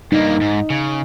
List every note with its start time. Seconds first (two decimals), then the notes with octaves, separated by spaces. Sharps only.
0.12 G2 A#3 D#4
0.41 G#2
0.70 C#3